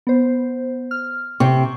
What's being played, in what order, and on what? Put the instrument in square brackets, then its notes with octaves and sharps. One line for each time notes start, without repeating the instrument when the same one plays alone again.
[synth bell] B3 C5
F6
[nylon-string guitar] C3 [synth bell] G5 C#6